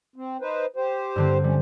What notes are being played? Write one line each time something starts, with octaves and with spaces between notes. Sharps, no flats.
C4
D#4 B4 C5
G4 C5
G2 D3 C4
G3 C#4